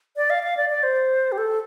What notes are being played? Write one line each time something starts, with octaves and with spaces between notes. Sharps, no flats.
D5
F5
F5
D5
D5
C5
G4
A4